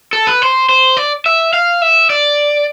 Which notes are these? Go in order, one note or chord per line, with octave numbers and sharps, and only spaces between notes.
A4
B4
C5
C5
D5
E5
F5
E5
D5